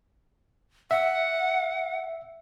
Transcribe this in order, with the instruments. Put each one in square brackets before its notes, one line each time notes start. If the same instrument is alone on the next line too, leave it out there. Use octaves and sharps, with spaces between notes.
[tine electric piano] E5 [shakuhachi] F#5